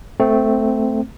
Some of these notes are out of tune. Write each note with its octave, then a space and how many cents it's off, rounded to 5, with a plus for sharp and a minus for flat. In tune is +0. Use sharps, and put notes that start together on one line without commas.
A3 +0 C4 -15